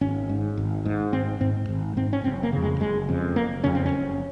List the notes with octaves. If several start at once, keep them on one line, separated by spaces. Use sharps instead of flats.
G#1 C#4
G#2
G#1
G#2
G#1 C4
G#2 C4
G#1
G#2 C4
C#4
F#1 C4
A#3
F2 C#3
G#3
F#1 G#3
F2 C#3
F#1 A#3
F2 C#3 C#4
C4
C#4
F#1